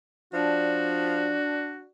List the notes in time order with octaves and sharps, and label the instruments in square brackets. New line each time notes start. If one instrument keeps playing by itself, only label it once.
[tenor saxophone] F3 [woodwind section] D4 [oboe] F#4 [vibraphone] D5 A5